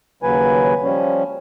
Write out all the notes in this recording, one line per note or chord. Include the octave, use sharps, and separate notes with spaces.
D#2 C#3 F#3 B4 G#5
F3 G3 C#4